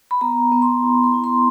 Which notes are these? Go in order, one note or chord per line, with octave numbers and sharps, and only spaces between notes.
B5
B3 A#5
B3
C6
E4
C6
E4
C6